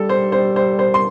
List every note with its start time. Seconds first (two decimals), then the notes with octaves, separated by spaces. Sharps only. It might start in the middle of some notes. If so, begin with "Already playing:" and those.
Already playing: G3 A4
0.09 C5
0.32 C5
0.56 C5
0.79 C5
0.94 C6